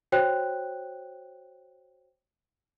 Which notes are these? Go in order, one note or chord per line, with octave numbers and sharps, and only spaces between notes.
F#4 C5 C#5 G5 F#6